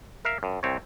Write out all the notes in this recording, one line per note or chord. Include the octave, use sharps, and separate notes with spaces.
A#4 E5 F5
F#2
C2 C4 C#5